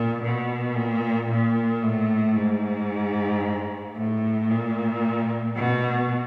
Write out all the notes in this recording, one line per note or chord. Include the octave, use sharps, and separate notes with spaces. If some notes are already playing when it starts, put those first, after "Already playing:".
Already playing: A#2
B2
A#2
A#2
A2
G#2
A2
A#2
B2